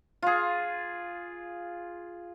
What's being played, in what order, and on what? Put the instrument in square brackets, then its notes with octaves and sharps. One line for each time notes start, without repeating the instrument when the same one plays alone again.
[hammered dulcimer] F4 G#4